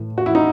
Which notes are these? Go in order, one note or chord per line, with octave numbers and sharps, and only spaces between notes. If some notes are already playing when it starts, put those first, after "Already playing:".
Already playing: A2 E3
F#4
E4
D#4